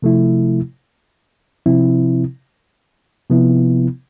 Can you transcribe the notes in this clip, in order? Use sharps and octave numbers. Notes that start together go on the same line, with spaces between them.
C3 F3 A3 E4
C3 F3 C4 E4
C3 F3 B3 E4